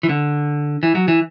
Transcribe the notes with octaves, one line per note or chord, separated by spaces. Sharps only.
E3
D3
E3
F#3
E3